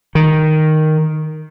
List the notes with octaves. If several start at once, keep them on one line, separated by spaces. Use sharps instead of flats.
D#3